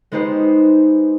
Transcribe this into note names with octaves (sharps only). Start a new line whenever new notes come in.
G#3 B3 D#4 G4 C5